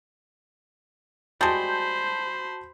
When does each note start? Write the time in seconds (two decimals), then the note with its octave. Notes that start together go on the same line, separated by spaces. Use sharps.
1.41 G3 G#3 F#4 C5 A5 B5 G6